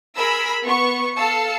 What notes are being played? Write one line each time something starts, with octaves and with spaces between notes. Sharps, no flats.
G#4 A#4 B5 E6
B3 C#6
A4 F5 A5 E6 C#7